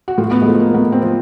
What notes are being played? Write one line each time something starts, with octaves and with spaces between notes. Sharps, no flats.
F#4
A2 F4
B3
G#3
F3 A3
A#3
A2 B3
C4
F3